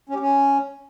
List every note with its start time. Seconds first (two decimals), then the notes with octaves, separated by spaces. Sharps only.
0.09 C#4
0.15 G4
0.20 C#4